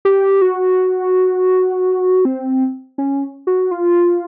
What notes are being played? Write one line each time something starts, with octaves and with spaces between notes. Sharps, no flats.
G4
F#4
C4
C#4
F#4
F4